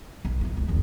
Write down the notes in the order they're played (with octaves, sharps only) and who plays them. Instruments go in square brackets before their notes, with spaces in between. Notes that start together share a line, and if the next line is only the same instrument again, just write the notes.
[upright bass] B1
D#3 E3
[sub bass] C#2 [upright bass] A#2
[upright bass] F#1 D#3 [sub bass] E2